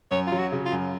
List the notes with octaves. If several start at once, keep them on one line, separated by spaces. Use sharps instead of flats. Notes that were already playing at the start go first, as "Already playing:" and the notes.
F#2 C#5
F4
F#3
F#4
C#3
F4
F#2